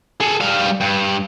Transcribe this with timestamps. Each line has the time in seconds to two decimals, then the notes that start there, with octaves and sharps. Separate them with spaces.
0.20 G#4 A4
0.40 G3 F5
0.81 G2